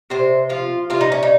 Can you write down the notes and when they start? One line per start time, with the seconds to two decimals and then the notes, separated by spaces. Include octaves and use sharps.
0.10 C3 C5
0.49 F3 F4
0.90 C3 F4
1.01 D#4
1.12 C#4
1.23 D#4